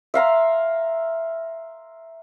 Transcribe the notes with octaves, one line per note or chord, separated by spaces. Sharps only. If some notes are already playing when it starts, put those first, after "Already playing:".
E5 F5 A#5 C6